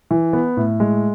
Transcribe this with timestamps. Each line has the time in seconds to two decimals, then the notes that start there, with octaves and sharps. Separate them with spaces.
0.11 E3
0.33 B3
0.57 A2
0.80 G#3